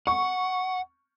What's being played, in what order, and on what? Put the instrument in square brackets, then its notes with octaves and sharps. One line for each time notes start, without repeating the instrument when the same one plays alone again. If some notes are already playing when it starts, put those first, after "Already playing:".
[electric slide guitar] F#5 [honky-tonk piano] C#6